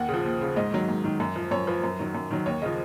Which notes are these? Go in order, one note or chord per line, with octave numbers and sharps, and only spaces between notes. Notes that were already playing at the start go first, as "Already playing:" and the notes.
Already playing: D#2 F#5
C#3 F3
D#2
C#3 F3
G#2 D#5
D#3 F#3
G#2
D#3 F#3
F#2
F3
F#2 C#5
F3 B4
F#2
D#3 F#3
F#2
D#3 F#3
D#2 C#5
C#3 F3 D#5